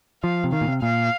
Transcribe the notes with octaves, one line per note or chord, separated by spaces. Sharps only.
F3 F5
C3
D#3 F5
A#2
C3
A#2 F5